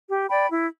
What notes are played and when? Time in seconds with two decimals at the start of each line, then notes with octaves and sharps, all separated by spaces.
0.09 G4
0.29 D5 G5 B5
0.49 E4